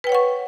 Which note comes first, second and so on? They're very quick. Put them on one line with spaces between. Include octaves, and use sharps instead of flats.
B4 G5 C#5 F#5 C#6